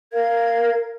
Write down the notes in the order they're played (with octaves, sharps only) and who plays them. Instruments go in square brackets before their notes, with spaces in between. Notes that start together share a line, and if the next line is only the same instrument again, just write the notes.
[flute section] A#4 F5 G#6